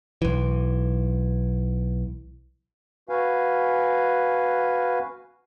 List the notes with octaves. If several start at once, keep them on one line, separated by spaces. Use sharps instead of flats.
B1 E3
F#4 B4 F5 G#5